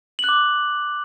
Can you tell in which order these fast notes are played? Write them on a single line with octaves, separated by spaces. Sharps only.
F#7 F#6 D6